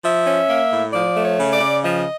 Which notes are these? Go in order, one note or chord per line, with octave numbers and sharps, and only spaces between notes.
F3 E5
C#4
A#3
A2
F3 D5
A3
C#5
C#3
D5
C#3
F3 D#5